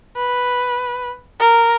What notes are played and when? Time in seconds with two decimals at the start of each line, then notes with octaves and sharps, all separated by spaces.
0.17 B4
1.40 A#4